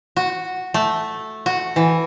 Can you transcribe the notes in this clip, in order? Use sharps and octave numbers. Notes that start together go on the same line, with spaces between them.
F#4
A3
F#4
E3